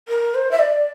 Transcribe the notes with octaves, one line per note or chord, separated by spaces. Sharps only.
A#4
C5
E5
D5